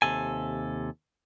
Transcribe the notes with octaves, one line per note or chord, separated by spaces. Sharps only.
D#2 C3 A4 G#5